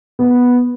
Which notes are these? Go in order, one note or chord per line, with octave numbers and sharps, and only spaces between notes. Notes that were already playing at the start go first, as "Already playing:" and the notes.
B3